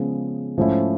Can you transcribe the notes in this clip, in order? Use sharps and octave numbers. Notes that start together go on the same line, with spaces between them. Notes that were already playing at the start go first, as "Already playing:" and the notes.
Already playing: C#3 F3 G#3 B3
G#2 F3 A3 C#4 E4